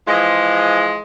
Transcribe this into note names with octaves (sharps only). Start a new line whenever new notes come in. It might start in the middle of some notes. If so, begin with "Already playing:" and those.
E3 F3 G#3